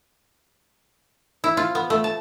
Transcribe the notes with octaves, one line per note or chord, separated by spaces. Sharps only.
E4
F4
B3
A3
A5